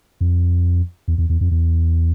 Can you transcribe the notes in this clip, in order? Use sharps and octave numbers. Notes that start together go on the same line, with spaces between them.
F2
E2
E2
E2
F2
E2